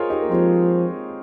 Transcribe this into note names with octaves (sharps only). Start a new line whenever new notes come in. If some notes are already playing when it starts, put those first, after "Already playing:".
Already playing: F4 G#4 A#4 C5 C#5 D#5
D#4 G4
A#3
F3 G#3 C4